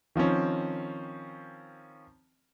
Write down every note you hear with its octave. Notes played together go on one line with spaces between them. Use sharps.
D#3 F3 C4 C#4